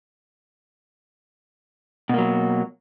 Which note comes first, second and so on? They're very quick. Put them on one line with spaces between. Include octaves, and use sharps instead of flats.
B2 A#3 F#3